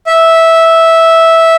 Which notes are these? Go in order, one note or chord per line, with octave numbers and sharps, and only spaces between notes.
E5